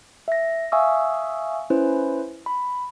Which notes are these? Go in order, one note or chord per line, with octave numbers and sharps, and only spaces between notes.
E5 A#6
E5 F5 G#5 C#6 D#6 E6
C#4 E4 B4 C5
B5